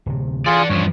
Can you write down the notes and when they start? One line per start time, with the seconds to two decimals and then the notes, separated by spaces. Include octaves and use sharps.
0.06 D1 C3
0.46 E3 F4 G#4 D5 F#5
0.70 G2 F3 C#5